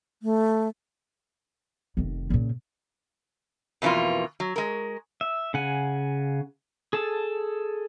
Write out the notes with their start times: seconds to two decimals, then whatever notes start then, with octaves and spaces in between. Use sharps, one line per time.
0.22 A3
1.97 F1 D#3
2.30 A#2 C#3
3.82 F2 B2 E3 A#3 F4
4.40 F#3
4.56 G#3 A#4
5.21 E5
5.54 C#3 F#5 G#5
6.93 G#4 A4 A5